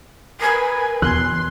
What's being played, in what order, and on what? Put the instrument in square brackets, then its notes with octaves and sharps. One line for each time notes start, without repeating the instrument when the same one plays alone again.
[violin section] A#4 B4 [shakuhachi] G#5
[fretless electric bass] E2 B2 [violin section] C6 [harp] F#6